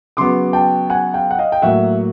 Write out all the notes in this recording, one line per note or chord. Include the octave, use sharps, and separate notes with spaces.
C#3 F#3 B3 C6 D6
G5 A5
F#5 G#5
F5 G5
F#5
D#5 F5
G5
A2 F#3 A#3 E5 F#5